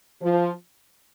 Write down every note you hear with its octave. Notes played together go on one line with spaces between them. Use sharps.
F3